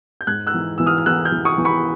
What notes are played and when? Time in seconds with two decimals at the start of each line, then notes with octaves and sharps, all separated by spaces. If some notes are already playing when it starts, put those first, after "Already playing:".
0.21 G6
0.27 G#2 F#6 G#6
0.47 E6 F#6
0.54 E3
0.78 E3 E6
0.86 D#6 F6
0.98 F6
1.06 E3 E6 F#6
1.25 F6 G6
1.32 E3
1.45 C#6 D#6
1.58 E3
1.65 B5 C#6